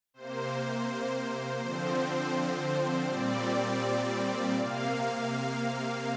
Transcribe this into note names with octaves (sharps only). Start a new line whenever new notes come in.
C3 A#3 C5
D3 F3 C4 C5
A#2 G3 C4 D5
C3 A#3 F5